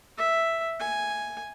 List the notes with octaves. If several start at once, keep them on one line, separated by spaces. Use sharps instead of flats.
E5
G#5